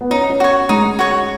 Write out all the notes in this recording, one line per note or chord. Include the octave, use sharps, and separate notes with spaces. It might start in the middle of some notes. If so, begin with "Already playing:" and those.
B3
C#4 D#4
C#4
F#4 C#5
G#3 D#4
F#4 C#5